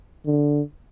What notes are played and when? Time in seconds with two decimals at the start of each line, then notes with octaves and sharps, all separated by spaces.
0.26 D3